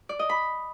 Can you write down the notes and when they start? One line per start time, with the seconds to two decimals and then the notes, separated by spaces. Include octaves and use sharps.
0.09 D5
0.19 D#5
0.29 B5